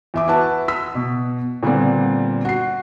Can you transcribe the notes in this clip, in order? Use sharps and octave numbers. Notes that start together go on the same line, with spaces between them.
E2 E5 D6
E4 F#4 B4 A5
E6 B6
B2
A#2 D3 G3 B3 C4
F#4 C7